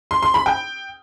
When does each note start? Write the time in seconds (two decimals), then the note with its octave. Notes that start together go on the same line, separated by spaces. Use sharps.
0.11 C6
0.23 C6
0.34 B5
0.46 G5